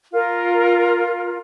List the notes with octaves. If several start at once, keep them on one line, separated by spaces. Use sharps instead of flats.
F4 A#4